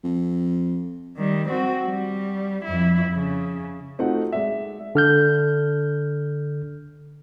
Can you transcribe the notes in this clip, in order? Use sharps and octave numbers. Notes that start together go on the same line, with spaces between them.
F2
D#3 G3
C4 F#4
G3
F2 E4
C#3
A3 C4 D#4 F4 F#4 F#5
G#3 D5 E5
D3 F6 G6